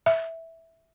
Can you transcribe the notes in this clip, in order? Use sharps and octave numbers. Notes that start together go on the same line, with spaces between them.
E5